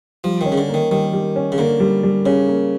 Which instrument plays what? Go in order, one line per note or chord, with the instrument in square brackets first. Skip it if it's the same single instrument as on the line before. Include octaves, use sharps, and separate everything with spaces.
[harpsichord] F3 [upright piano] G3
[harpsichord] D#3 [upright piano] C#4
[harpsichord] C#3
D3
[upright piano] A#3
[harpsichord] D#3
[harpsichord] D#3 [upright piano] G3
[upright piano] G3
C#4
[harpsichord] C#3
[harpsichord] D3 [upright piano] A#3
[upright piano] G3
G3
[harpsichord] C#3 [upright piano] C#4
[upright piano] A#3